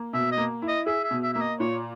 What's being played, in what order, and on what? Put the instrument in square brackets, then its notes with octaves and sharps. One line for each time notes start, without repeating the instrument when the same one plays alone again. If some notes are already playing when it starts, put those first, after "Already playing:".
Already playing: [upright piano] A#3
[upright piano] B2 [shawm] E5
[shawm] D#5
[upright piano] A#3
E4
[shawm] D#5
[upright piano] G#4 [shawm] E5
[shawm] E5
[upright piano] B2
[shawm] E5
[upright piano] A#3 [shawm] E5
[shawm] D#5
[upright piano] A#2 [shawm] C#5